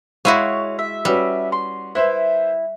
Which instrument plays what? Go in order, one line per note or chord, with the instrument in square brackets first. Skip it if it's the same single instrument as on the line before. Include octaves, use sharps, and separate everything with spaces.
[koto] G#3 E4 F#4 [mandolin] C#5 [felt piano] F5 D#7
[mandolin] E5
[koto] G3 [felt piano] C#4 F#4 B4
[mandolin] C6
[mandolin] E4 [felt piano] B4 C5 E5